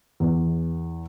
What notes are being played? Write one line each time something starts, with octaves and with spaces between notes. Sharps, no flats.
E2